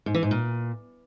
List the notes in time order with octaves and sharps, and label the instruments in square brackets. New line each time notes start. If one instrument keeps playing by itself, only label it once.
[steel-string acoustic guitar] G#2
E3
G#2
A#2